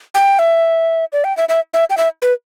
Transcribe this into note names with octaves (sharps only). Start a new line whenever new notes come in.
G5
E5
D5
G5
E5
E5
E5
G5
E5
B4